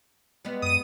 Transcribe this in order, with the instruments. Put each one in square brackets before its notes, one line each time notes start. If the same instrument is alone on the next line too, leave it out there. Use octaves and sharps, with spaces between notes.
[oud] G3 G#3 B3
[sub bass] F#2 [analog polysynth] D#6 D#7